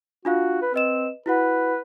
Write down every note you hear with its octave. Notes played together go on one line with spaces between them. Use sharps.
D4 F4 F#4 F5
B4
C4 B4 D#5 E7
E4 F#4 B4 F#5